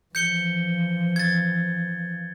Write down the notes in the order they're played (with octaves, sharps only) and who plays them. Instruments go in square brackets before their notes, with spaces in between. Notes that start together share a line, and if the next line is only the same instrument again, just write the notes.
[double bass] E3 F3 [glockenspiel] G6 C#7 G7
[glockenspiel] G#6 A6